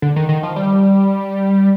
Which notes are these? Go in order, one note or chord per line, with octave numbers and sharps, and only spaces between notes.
D3
D#3
D#3
F3
G3